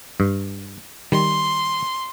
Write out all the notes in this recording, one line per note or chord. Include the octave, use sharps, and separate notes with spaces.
G2
D#3 G3 C6